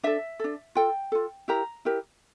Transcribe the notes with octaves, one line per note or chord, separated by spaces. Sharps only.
D4 A4 E5
D4 A4
F4 A4 G5
F4 A4
E4 G4 A#4 A#5
E4 G4 A#4